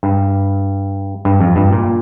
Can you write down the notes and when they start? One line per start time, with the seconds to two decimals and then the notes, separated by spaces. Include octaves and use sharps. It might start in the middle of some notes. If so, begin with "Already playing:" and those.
0.03 G2
1.25 G2
1.41 F2
1.56 G2
1.73 A#2